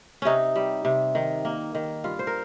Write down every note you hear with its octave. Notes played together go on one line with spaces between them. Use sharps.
C3 C#4 D#4
G3
C3
D#3
A#3
D#3
G2 F4
C5
A#4